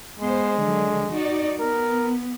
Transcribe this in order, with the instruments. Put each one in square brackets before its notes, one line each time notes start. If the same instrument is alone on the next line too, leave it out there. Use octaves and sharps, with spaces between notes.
[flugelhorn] G#3 [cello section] B3 C5
[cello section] D3 F3 F#3
D#4 F#4 D5
[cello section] B3 [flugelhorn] A#4